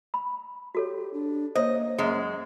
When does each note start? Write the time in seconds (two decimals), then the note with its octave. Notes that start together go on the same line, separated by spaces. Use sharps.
0.14 B5
0.75 F#4 G4 A4 C#5
1.13 D4
1.55 A#3 C5 C#5 D#5
1.98 F#2 G#3